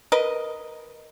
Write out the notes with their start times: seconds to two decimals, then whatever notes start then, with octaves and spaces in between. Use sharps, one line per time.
0.12 A#4 B4 D#5